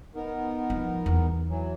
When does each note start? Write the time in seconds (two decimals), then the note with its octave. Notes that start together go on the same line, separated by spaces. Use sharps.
0.15 B3 D#4 A#4
0.70 F3
1.06 E2
1.49 E3 F#3